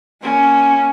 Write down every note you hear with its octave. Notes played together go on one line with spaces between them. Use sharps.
A#3 C#4